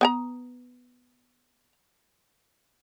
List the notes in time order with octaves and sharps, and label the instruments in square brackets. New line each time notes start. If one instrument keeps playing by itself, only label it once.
[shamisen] B3 G5 A#5